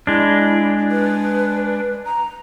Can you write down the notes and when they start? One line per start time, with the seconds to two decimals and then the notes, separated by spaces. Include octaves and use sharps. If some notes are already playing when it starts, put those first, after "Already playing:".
0.07 G#3 D4 E4
0.91 B4
2.05 A#5